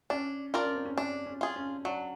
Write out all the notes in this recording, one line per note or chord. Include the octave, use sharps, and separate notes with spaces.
C#4 D4
D4 F4 A#4 D5
C#4
C4
C#4
C#4 D4
C#4
F4 G#4
C#4
F#3 D4